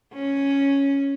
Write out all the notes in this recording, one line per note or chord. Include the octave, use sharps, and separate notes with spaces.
C#4